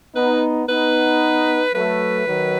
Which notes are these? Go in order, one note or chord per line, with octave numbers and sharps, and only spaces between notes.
B3 D#4 B4
B3 D#4 B4
F#3 A3 B4
D#3 F#3